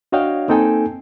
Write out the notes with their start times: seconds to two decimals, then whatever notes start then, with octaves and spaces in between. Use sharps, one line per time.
0.12 D4 F#4 C#5 D#5 F5 G5
0.48 A#3 C4 D#4 A4 G5 G#5